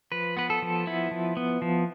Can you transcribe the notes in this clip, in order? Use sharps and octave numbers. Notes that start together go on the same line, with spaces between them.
F3 B4
B3 B4
A4
F3
B3 E4
F3
B3
F3